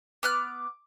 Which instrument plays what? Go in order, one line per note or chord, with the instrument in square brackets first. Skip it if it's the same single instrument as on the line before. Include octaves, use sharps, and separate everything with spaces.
[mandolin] B3 F6 F#6 [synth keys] D6